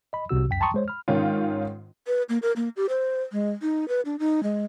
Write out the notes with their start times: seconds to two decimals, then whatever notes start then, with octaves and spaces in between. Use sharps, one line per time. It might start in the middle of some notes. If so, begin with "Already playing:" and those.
0.13 D#5 B5
0.29 C2 C3 F#4 E6
0.49 C#2 F#2 G5 B6
0.60 G5 A5 A#5 C6 C#6 D#6
0.74 G#3 C5 C#5
0.88 B5 F6
1.08 G#2 D#3 C#4 F4
2.07 B4
2.29 A#3
2.42 A#4
2.56 A#3
2.77 G4
2.89 C5
3.32 G#3
3.62 D#4
3.88 B4
4.05 D4
4.19 D#4
4.43 G#3